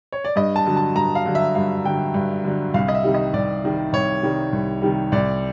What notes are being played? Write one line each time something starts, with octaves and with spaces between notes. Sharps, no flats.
C#5
D5
G2 D#5
A5
D3 F#3
A5
G2 A#5
F5
D3 F#3
E5
G2 F5
D3 F#3 G5
G2
D3 F#3
C2 F5
D#5
E5
C3 D#3 G3
D#5
C2 D5
C3 D#3 G3
C2 C#5
C3 D#3 G3
C2
C3 D#3 G3
C2 D5